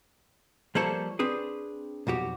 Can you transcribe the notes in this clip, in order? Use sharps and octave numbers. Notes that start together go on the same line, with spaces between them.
F3 G3 A#3 A4 C5 C#5
C4 D4 G#4 B4
B1 F2 F#4 G4